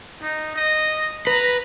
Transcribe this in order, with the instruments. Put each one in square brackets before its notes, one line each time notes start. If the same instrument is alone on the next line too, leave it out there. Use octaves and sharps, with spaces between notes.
[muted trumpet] D#4
D#5
[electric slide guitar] B4 [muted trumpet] A#5